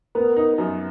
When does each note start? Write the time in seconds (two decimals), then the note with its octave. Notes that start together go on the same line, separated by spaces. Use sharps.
0.15 B3 A#4
0.36 D#4
0.58 F#2